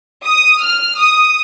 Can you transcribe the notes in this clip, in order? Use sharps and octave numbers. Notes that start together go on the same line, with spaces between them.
D#6
F6
D#6